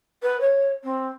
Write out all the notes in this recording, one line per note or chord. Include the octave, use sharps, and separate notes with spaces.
B4
C#5
C4